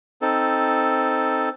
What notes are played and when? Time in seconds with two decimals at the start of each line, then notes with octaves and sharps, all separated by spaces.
0.22 C4 D#4 A4